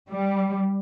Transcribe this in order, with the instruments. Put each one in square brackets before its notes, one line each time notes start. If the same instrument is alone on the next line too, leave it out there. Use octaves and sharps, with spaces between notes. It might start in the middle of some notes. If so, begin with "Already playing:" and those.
[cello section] G3